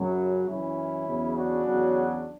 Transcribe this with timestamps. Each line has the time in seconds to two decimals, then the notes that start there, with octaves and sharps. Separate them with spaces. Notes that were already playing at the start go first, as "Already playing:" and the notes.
Already playing: F#2 C#3 F#3
0.47 F#2 E3 C#4 E4
1.06 E2 C#3 F#3
1.36 D4 F#4
1.65 E2 C#3 F#3